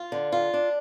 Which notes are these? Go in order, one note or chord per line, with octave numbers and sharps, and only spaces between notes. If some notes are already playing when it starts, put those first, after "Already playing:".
Already playing: F4
D3
F4
D4